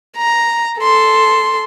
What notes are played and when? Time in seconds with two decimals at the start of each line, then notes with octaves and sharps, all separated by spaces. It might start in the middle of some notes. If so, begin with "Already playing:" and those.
0.17 A#5
0.79 A4 C6